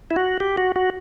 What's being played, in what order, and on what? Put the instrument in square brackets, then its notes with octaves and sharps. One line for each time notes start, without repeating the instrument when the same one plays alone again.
[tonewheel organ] E4
F#4
G4
F#4
F#4